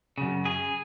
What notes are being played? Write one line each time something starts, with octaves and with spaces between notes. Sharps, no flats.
F#2 C#3
G#4